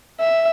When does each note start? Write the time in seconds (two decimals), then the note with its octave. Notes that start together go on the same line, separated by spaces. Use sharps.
0.20 E5